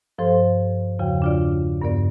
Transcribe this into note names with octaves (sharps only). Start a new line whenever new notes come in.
G2 F3 A4 C5 C6
E2 C#3 F3 F#4 G5
D4 F4 D5
G2 B3 A#4 D5